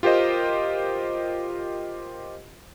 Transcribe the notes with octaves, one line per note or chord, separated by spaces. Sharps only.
F4 G4 A#4 C5 D#5